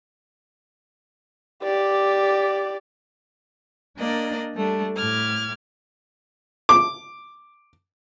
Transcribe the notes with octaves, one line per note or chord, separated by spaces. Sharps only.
G4 D5
A#3 D4 A#4 D5 D#5
G3 A3 D4
A2 D6 F6 G#6
D6